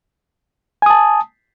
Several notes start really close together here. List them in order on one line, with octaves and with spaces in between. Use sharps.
G#5 D#6 A5